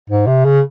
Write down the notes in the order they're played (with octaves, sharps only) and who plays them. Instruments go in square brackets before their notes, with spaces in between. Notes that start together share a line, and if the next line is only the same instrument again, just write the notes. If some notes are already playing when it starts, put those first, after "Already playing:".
[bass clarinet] G#2
C3
C#3